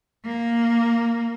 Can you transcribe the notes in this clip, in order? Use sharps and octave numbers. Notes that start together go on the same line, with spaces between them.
A#3